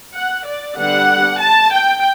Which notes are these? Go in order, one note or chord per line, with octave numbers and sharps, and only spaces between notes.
F#5
D5
D3 G3 B3 D4 F#5
A5
G5